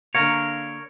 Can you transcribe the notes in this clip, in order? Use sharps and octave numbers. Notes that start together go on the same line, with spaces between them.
D3 A#3 A#4 C#5 F5